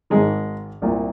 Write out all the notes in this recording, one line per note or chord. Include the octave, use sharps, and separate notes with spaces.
G#1 G#2 D#3 G#3
C2 A#2